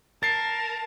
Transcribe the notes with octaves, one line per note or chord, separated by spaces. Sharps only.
A#4 A5 A6 C7